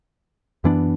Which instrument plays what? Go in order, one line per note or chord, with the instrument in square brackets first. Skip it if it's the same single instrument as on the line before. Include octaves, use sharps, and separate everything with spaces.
[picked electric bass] F#2 E3 B3 D4